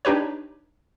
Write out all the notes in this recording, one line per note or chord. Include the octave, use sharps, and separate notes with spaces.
D4 D#4 G4 B4 C#5